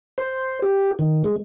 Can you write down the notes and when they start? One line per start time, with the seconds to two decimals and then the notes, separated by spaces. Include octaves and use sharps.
0.18 C5
0.62 G4
0.99 D#3
1.24 G#3